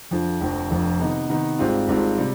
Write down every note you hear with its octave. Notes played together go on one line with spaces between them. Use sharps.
F2 D3 F3
F1 F2 D3 F3
F1 F2 D3 F3
C3 D#3 B3 D#4
C3 D#3 B3 D#4
G#1 G#2 G3 C4 F4
G#1 G#2 G3 C4 F4
C3 G3